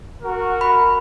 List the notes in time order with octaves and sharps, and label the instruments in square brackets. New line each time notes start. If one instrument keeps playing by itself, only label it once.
[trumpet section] F#4 A#4
[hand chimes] B5